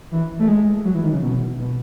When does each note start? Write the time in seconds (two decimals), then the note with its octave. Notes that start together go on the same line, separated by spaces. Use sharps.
0.12 E3
0.39 A3
0.48 G#3
0.84 F#3
0.94 E3
1.04 D#3
1.13 C#3
1.23 B2
1.59 B2